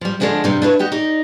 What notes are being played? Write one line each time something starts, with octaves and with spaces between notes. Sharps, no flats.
F3 G3
D3 F3 G#3 A3 D4
G2 C3 G3
D4 E4 B4 C#5
F#4 G4 D#5
D#4 D5